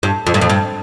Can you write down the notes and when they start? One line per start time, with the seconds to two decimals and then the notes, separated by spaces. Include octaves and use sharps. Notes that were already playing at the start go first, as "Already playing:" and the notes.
0.03 G2
0.27 F2
0.34 G2
0.41 F2
0.49 G2